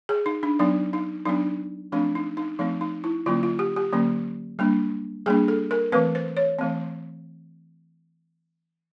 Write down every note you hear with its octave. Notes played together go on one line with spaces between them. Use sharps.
G#4
D#4
D4
F#3 B3 D4 D#4
D#4
F#3 B3 D4 D#4
F3 A3 C4 D4
D#4
D#4
F3 A3 C4 D#4
D#4
E4
D3 F#3 A#3 C#4 F4
F4
G4
G4
D3 F#3 A#3 C#4
G3 A#3 D4
G3 A#3 D4 G#4
A4
A#4
E3 A3 C4 B4
C5
C#5
E3 A3 C4